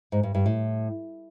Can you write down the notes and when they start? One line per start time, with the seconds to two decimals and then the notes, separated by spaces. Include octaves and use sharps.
0.12 G#2
0.23 G2
0.35 G2
0.46 A2